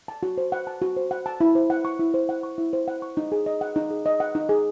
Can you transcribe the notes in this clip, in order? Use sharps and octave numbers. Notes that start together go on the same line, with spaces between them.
A5
F#4
C5
F#5
A5
F#4
C5
F#5
A5
E4
C5
F#5
C#6
E4
C5
F#5
C#6
E4
C5
F#5
C#6
D#4
G#4
D#5
F#5
D#4
G#4
D#5
F#5
D#4
G#4